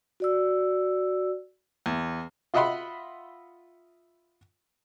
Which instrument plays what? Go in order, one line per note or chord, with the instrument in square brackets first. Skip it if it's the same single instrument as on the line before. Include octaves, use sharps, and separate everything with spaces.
[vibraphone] F#4 D5 E6
[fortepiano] E2
F4 D#5 E5 F#5 B5 C6